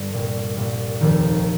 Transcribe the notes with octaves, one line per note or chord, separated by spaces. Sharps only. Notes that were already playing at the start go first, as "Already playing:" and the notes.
Already playing: G1 G2
C2 A#2 G3
C2 A#2 G3
F1 D#2 D#3